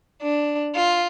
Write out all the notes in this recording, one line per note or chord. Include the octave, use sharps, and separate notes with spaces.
D4
F4